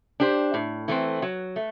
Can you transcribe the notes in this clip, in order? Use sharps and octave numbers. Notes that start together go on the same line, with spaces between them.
D4 G4 C5
A2
E3 A3 C4
F#3
A3